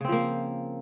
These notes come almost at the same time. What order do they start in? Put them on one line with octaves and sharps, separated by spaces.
C#3 C4 F3 A#3